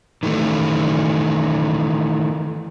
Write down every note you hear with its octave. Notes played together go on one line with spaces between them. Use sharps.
D#3 E3 A3